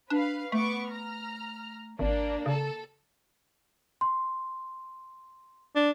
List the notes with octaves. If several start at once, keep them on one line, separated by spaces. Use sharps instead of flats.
D4 B4 F5
A3 B3 C#6 D6
A#5 F6
G#1 A#3 D4
C#3 A4
C6
D4